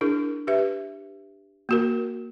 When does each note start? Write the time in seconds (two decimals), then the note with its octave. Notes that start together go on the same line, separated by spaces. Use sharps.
0.01 D4 E4 G#4 A#4
0.47 G4 B4 E5
1.69 A#3 F#4 A#4